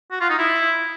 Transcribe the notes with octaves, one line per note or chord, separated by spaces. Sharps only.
F#4
F4
D#4
E4